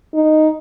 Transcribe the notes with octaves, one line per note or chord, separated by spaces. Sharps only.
D#4